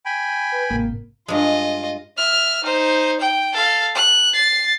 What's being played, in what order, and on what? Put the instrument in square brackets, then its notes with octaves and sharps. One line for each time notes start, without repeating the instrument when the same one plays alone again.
[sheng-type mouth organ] G5 G#5 B5
[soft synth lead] B4
[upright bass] G#1 C3 [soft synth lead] A#3
[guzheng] G2 G#3 [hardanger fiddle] F4 D#5
[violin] E5 F6
D#4 C5
G5
A4 F5
F#6
A6 C7